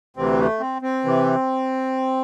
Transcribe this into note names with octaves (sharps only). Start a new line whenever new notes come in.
D2 C3 E3 C4
A3
C4
C4
C3 E3